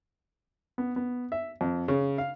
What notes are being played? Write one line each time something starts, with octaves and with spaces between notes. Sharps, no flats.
B3
B3
E5
F2
C#3
F5